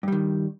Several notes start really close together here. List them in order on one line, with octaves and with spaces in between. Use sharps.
G2 G3 D#3